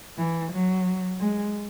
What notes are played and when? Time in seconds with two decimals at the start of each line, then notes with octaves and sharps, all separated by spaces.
0.18 E3
0.52 F#3
1.19 G#3